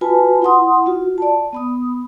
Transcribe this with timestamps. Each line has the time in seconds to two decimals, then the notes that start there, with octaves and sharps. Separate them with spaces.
0.01 F4 F#4 B4 G#5 A5 B5
0.42 E4 F#5 C6 D#6
0.86 F4 F#4
1.18 D5 A5
1.53 B3 B5 D#6